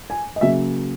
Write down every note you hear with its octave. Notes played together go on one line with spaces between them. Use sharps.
G#5
D#5
C#3 F#3 A#3 E5